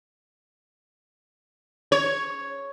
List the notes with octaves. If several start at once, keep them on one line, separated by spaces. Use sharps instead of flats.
C#5